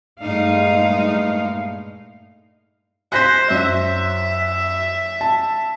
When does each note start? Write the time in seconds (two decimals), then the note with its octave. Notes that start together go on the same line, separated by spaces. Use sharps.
0.21 G2 A#2 G#3 A3 D#4 F5
3.12 C5 F#6 A#6 B6
3.50 F#2 E5
5.21 A5